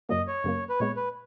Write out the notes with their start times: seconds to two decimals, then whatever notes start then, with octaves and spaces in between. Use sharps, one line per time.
0.09 F#2 C#3 F#3 A#3 D#5
0.27 C#5
0.44 F#2 C#3 F#3 A#3
0.69 B4
0.79 A#2 G#3 B3 C#5
0.97 B4